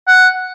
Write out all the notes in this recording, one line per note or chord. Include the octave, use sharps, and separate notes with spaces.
F#5